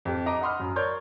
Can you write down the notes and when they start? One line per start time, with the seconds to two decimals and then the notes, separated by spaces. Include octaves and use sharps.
0.05 F2 G4
0.26 D#5 A#5 D6
0.41 D#5 F#5 B5 C6 D#6 F6
0.60 F#2
0.76 A#4 C#5 D5 C6 G6 G#6